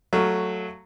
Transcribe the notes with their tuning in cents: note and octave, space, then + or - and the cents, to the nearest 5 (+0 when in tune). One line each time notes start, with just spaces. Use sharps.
F#3 +0 A3 +10 F5 +0